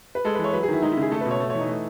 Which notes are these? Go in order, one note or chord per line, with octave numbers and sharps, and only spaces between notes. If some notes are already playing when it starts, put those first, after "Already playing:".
B4
G#3 A4
B4
E3
C#5
F#3 B4
G#4
D#3 E4
G#3 D#4
E4
C#3 G#4
A3 A4
B4
B2
C#5
A3
C#5
E3 D#4
A3